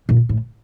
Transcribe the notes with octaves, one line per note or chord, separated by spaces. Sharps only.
A#2
A2